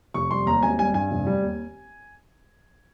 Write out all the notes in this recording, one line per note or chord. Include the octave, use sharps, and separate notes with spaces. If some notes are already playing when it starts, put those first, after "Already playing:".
F1 C#6
G3 C6
D#2 A#5
G#1 G#5
G3 G#5
G2 G#5
F1
G3
D#2